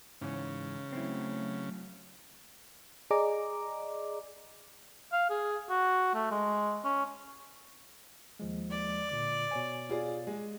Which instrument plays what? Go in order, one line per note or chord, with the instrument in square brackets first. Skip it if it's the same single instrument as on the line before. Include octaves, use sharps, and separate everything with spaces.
[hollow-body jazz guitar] G#2 E3 C#4 [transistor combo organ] C#3
[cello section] F#3 A3 [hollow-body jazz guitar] C4 E4
[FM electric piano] G#4 D5 D#5 A#5 D6
[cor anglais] F5
G#4
F#4
A3
G#3
C#4
[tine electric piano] D#2 F3 G#3
[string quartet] D5
[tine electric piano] A#2 D3 D6
B2 C#5 G#5
[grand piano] F4 G#4 D5
G#3